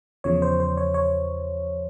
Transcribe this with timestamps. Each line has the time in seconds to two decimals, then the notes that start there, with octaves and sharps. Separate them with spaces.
0.24 E2 C#3 F3 C#5
0.42 C5
0.60 C5
0.77 C#5
0.94 C#5